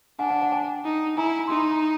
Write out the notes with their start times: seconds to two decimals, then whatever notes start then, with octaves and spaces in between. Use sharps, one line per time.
0.19 D4 F#5 G#5
0.30 F#5 G#5
0.42 F#5 G#5
0.52 G5 A5
0.84 D#4
1.17 E4 G#5 A#5
1.47 D#4 C6
1.59 B5
1.71 A#5